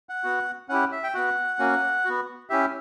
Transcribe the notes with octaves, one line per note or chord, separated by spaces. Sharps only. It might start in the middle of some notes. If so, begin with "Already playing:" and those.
F#5
B3 F#4
C#4 E4 G4 F#5
E5
G5
B3 F#4 F#5
A#3 C#4 F#4
B3 F#4
C#4 E4 G4 E5